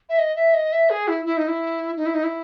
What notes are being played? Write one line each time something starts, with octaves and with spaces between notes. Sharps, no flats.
E5
D#5
E5
D#5
E5
G#4
E4
E4
D#4
E4
D#4
E4
D#4
E4